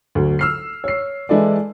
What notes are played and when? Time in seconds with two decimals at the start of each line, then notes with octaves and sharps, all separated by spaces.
0.15 D2 F#3
0.39 E6 F6 C7
0.84 C#5 C7
1.29 E3 G#3 E4 A4 D5